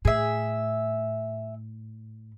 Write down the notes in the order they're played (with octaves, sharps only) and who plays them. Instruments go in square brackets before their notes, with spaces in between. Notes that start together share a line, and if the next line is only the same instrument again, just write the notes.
[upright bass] A2 [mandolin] G#4 E5